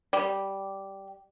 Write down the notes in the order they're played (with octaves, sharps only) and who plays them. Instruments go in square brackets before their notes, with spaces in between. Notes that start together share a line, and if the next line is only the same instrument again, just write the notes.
[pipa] G3